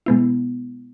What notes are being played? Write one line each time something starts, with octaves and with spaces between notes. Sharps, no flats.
B2 G#3 B3 E4